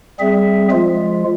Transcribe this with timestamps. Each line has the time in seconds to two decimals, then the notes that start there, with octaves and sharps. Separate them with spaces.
0.20 G3 C4 G#4 E5
0.72 F3 G#3 F4